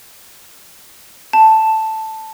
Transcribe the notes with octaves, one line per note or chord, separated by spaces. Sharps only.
A5